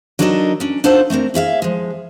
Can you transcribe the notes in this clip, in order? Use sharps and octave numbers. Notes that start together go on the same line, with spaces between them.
F#3 D4 D#4 A4 A#4 D#5
C#4 D4
D4 D#4 F4 A4 C5 F#5
A3 C4 D4 A#4
E4 G#4 E5 F5
F3 G#3